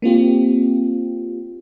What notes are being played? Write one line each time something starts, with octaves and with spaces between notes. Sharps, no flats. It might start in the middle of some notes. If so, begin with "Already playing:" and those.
A#3 C4 F4 G4